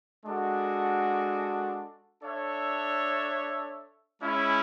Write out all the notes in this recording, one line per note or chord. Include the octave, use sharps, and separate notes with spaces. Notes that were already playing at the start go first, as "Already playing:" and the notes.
G#3 D4 F#4 A4
D4 A4 C#5 E5
G#3 C#4 E4